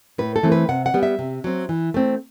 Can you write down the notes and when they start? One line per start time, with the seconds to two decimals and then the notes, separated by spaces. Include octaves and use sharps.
0.18 A2 B4
0.36 A4
0.43 E3 A3 C4
0.52 B4
0.69 C3 F#5
0.86 F#5
0.94 G3 B3
1.03 E5
1.19 C3
1.44 F#3 C4
1.69 E3
1.94 A3 C4